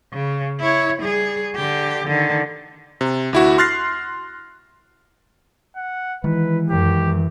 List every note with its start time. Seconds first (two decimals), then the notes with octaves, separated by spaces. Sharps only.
0.13 C#3
0.60 E4 C#5
1.02 G3 G#4
1.56 D3 G4
2.06 D3 D#3
3.01 C3
3.33 D2 E4 F#4
3.58 C6 F6 F#6 A6 A#6 C7
5.76 F#5
6.24 D#3 E3 G#3 B4
6.70 F#2 G4